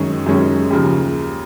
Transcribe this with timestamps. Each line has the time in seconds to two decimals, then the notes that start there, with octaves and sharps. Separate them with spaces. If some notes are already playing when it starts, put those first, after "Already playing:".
Already playing: F#2 D#3 G#3 C#4 G#4
0.26 F#2 D#3 G#3 C#4
0.71 D#2 C#3 F3